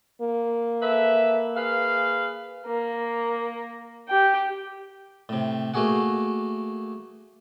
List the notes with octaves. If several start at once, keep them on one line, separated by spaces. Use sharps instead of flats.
A#3
A4 B4 E5
G#4 B4 F5
A#3
G4 G5
A2 C3
A3 A#3 F#4 G#4 F#5